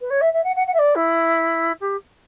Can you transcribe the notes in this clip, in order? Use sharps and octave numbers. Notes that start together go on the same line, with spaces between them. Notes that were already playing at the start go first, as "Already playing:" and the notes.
B4
C#5
E5
E5
F#5
F#5
F#5
E5
D5
E4
G4